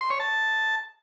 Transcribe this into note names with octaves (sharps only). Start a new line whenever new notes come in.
C6
C#5
A5